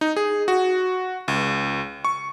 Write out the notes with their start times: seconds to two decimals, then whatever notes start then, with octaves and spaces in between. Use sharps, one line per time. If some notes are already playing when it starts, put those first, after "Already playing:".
0.01 D#4
0.16 G#4
0.48 F#4
1.28 C#2
2.05 C#6